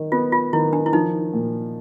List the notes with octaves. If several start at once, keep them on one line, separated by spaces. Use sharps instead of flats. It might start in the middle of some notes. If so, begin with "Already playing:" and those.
Already playing: D#3
B3 F4
F4
D#3 E4
D4
E4
F3 D#4
A#2